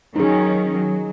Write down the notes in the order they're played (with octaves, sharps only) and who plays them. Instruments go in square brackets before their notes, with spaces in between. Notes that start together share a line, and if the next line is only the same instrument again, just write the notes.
[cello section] D#3 F#3 C#4 [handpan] D#4 G#4
[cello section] F#3